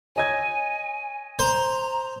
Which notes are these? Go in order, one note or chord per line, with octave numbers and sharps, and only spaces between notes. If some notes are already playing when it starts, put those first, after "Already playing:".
C#5 D#5 G#5 G#6
C5 A#5